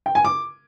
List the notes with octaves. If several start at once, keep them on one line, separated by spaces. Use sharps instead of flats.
G5
G#5
D6